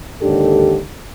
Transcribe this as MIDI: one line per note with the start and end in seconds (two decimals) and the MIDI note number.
0.22 0.79 39
0.22 0.79 44
0.22 0.79 50
0.22 0.79 62
0.22 0.79 67
0.22 0.79 69